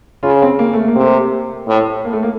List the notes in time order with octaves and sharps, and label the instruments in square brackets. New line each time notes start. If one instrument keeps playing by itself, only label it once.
[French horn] C#3 [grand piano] F4
[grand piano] C4
A#3
A3
A#3
[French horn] C3
A2
[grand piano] A#3
A3
A#3